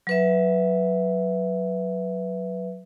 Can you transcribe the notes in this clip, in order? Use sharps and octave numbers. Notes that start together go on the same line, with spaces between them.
F#3 B4 E5